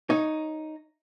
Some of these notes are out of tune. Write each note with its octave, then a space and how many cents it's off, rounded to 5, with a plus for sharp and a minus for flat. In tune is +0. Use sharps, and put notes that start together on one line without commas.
D#4 +0 C#5 +0